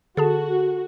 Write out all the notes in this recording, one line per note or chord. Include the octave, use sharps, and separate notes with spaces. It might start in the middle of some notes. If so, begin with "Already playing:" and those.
D3 F#4 G#4 A4 A5